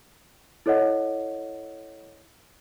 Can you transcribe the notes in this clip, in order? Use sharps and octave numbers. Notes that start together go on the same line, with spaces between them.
E4 A4 C#5 D#5 F#5